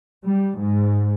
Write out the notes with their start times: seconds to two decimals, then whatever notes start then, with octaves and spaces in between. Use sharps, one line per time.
0.24 G3
0.59 G#2